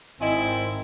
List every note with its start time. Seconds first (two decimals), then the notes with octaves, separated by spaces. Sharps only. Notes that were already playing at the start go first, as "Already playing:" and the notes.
0.21 G#1 D#3 C4 E4 D5 D#5 G#5